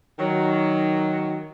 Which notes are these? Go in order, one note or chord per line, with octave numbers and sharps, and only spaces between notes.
D#3 F#3